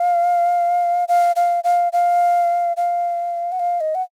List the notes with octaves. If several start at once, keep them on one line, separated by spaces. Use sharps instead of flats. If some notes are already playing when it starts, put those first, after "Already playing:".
Already playing: F5
F5
F5
F5
F5
F5
F#5
F5
D#5
F#5